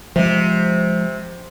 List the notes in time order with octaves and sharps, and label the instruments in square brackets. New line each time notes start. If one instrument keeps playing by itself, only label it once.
[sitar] C3 [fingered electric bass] F3 G#3